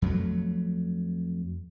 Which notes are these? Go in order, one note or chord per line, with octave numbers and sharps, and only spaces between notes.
F2 F#3 G#3 A3